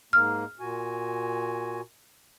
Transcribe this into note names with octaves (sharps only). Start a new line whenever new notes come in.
G#2 A#3 F6
A#2 F#4 G#5